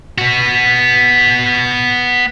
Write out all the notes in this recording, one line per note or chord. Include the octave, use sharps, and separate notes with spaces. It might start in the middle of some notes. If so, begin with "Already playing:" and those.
B3 F#4